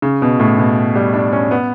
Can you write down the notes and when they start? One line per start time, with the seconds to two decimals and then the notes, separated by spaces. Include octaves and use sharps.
0.02 C#3
0.22 B2
0.39 A2
0.59 B2
0.95 G3
1.14 D4
1.32 C#4
1.51 B3